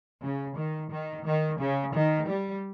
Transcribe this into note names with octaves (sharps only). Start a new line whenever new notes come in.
C#3
D#3
D#3
D#3
C#3
D#3
G3